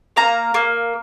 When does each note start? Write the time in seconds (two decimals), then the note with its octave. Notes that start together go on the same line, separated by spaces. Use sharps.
0.16 A#3 F5 A#5
0.54 A#3